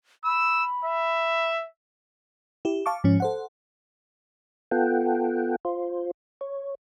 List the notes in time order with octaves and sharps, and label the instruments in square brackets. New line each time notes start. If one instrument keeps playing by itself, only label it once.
[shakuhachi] B5 [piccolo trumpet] E6
[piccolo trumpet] E5
[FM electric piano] E4 G4
F5 A5 C#6 D6
G#2 F3 C#4
A4 C5 F#5
[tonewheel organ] B3 F4 A4 F#5 G5
F4 C5
C#5